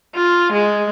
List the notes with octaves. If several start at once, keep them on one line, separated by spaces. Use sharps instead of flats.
F4
G#3